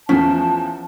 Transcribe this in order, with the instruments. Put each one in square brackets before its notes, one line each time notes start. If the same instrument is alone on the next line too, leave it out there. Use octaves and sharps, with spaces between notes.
[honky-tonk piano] E2 F3 [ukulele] C#4 [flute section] A5